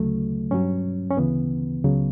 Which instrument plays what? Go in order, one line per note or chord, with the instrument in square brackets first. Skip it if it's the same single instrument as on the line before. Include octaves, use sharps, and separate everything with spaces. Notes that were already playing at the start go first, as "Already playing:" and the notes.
Already playing: [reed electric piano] D2 C#3 F#3 A3
G2 F#3 C#4
C#4
D2 C#3 E3 B3
C#2 C#3 F#3